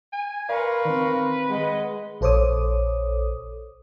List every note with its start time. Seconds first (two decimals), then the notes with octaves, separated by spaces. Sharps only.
0.13 G#5
0.49 A#4 B4 D5 F5 C6 C#6
0.85 D#3 C4
1.50 G#3 D#5 F#5
2.21 A#1 A4 C5 C#5 D6 D#6